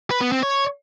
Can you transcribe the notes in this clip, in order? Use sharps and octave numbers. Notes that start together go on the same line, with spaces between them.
B4
B3
C4
C#5